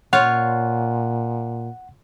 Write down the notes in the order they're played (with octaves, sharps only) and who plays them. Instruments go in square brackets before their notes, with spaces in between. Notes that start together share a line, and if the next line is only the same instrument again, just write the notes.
[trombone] A#2 [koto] F4 C#5 F5 [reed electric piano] F#5